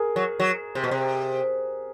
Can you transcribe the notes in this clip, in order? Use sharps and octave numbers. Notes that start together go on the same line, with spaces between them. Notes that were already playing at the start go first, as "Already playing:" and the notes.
Already playing: G#4 A#4
F#3
F#3
C3
B2
C3